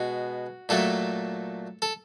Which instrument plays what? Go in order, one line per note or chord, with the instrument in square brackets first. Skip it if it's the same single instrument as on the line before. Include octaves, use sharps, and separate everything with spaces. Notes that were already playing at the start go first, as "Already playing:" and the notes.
Already playing: [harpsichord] B2 G#3 B3 F#4
A#2 F#3 A3 A4
A4